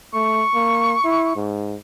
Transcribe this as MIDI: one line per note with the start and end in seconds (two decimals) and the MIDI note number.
0.14 0.43 57
0.14 1.44 85
0.54 0.94 58
1.05 1.31 64
1.36 1.76 44